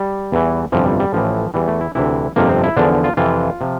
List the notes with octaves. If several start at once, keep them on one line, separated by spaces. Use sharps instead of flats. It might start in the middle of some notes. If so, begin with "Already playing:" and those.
Already playing: G3
E2 E3
G1 F2 C3 E3 F3
G3
G3
A1 A2 E3 F3
E2 E3 G3
A3
E4
D2 C3 E3 E4
G1 F2 C3 F3 A#3
C4
E4
E2 D3 F3 D4
F4
F2 C3 E3 F4
C3 F3